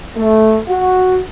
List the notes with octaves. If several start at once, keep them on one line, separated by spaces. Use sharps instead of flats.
A3
F#4